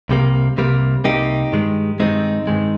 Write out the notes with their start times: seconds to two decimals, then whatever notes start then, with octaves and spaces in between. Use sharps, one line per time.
0.09 C2 C3 G3 A#3
0.57 C2 C3 G3 A#3
1.04 C2 C3 G3 A#3 D#4 G4
1.52 G2 D#3 G#3
2.00 G2 D#3 G#3 C4 D#4
2.47 G2 D#3 G#3